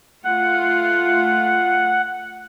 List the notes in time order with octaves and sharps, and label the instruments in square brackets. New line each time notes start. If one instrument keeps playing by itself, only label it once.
[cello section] A3 F4 [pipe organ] F#5